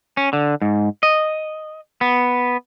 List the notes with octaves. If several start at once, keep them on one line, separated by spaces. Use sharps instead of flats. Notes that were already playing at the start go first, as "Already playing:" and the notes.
C#4
D3
G#2
D#5
B3